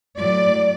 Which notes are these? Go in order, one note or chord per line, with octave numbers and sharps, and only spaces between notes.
A2 F#3 D5